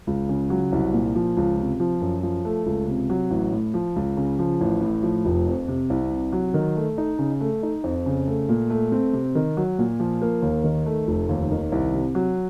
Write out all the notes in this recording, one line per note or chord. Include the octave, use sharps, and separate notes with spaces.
C#2
C#3
F#3
C2
A#2
F3
C#2
C3
F3
F#2
F3
A3
C#2
C3
F#3
A1
A2
F3
C#2
C#3
F3
A1
A2
F3
F1
F2
C3
C2
C3
F#3
D#3
A3
D#4
C#3
A3
D#4
F2
C#3
A3
A#2
A3
C4
C3
D#3
F#3
A#2
F3
A#3
D#2
D#3
A3
F1
D#2
D#3
C2
C3
F#3